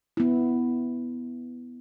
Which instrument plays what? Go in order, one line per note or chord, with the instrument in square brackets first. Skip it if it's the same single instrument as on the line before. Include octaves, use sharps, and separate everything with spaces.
[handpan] B3 E4